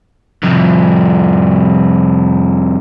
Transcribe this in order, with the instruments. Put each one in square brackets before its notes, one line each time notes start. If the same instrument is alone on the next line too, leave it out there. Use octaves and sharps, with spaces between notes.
[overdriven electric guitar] C2 F2